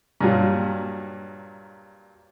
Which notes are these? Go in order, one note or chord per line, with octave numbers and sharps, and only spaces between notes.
G2 A#2 F#3